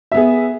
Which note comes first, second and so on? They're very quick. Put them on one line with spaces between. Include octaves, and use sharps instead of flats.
E5 B3 G#4